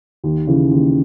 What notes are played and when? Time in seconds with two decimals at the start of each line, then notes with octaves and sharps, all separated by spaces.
0.24 D#2
0.47 C#3 E3
0.71 D#2